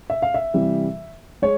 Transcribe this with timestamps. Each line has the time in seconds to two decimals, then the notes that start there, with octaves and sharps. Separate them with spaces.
0.10 E5
0.22 F5
0.34 E5
0.54 C3 E3 G3
1.42 G#3 C#5